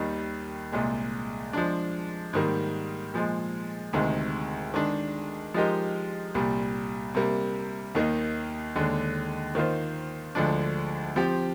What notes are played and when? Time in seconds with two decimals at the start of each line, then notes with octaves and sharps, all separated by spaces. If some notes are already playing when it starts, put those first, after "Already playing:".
Already playing: D#2 D#3 G3
0.72 C2 A#2 G#3
1.53 F3 G#3 D4
2.33 G#2 D#3 G3 A#3
3.14 A#2 F3 G#3
3.93 D2 C3 D#3 G#3
4.74 D#3 G#3 D4
5.54 F3 G#3 D#4 G4 A#4
6.35 C2 A#2 G3
7.15 C3 G3 A#3
7.95 D#2 D#3 A#3 D#4
8.76 D#2 D3 G#3 D4
9.55 D#3 A#3 F4 C5
10.35 D2 D3 F3 G#3 D4
11.16 F3 C4 G4